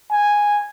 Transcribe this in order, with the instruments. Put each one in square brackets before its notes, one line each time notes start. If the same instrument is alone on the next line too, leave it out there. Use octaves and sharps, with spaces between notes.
[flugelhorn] G#5